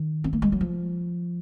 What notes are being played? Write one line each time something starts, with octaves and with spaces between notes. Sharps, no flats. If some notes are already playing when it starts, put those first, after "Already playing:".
Already playing: D#3
C4
A#3
G#3
F#3
F3